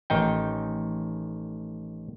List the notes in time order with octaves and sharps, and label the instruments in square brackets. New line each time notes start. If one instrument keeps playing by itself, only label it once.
[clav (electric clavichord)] A1 D#3 D#4 G5